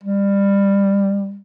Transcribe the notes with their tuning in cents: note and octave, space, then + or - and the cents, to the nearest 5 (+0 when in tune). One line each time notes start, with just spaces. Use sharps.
G3 +20